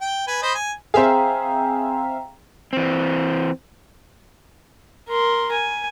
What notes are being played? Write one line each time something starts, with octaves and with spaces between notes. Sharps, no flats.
G5
B4 G#5
C5 D#5 B5
G#5
C4 G#4 C5 E5 F5 G5 A#5
E3 C4
A#4 C6
G#5